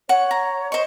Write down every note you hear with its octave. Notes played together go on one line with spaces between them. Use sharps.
C#5 F#5
A#5
C5 D#5 C#6